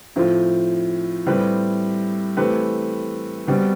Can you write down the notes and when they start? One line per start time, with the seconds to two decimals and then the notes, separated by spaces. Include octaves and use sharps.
0.16 A2 F3 C4 F4
1.26 A2 G3 C4 G4 B4
2.37 E3 A3 C4 G4 B4
3.47 B2 G3 C4